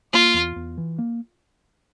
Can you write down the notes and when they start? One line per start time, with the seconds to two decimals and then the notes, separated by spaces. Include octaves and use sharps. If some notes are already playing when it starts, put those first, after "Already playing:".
0.13 A#3 F4
0.34 E2
0.56 E2
0.78 E3
0.98 A#3